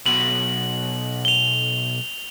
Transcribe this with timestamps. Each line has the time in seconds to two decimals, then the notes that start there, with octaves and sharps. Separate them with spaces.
0.06 B1 B2 F#7
1.25 F7 G7